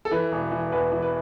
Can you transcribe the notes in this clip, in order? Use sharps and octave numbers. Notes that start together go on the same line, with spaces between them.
A4
E3 B4
E1
E3
E2 B4
E3
B4